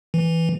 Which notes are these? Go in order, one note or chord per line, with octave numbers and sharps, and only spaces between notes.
E3